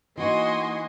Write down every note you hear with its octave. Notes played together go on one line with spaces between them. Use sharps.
E3 A#3 D#4 F#4 D#5 G#5 C6